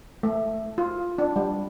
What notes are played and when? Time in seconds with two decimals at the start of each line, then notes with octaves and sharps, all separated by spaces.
0.23 A3
0.78 F4
1.18 D4
1.36 G3